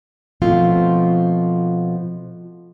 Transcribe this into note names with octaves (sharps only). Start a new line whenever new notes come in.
B2 F3 A3 C4 F4